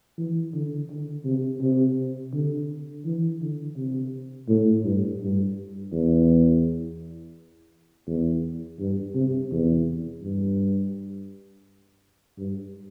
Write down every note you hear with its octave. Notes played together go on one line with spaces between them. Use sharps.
E3
D3
D3
C3
C3
D3
E3
D3
C3
A2
G2
G2
E2
E2
G2
C3
E2
G2
G2